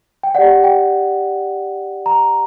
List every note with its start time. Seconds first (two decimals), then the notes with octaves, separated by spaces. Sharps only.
0.23 G5
0.35 G4 D5 F#5
0.64 G5
2.06 A#5